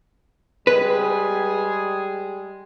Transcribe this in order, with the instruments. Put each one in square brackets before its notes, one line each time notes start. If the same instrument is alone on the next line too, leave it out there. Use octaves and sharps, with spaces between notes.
[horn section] G3 G#3 G#4 [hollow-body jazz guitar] B4